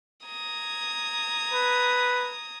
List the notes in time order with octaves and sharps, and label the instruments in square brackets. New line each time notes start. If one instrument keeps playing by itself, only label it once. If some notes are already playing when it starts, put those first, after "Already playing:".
[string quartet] A#5 D#6 G#6
[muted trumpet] B4